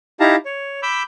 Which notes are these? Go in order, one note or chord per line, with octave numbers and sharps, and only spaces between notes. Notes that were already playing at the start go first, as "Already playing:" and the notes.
D#4 E4 G4 F5 A5 A#5
C#5
B5 D6 E6 G6